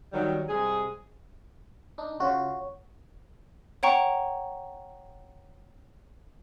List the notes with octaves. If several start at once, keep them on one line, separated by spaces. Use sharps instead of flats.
D#3 F#3 G3
C3 G3 G#3 G#4
D4 D#4
C#3 F4 F#4 C#5 F#5 C#6
C#5 F#5 G5 A#5 C#6